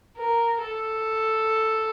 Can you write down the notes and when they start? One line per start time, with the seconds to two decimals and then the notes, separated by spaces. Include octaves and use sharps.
0.17 A#4
0.61 A4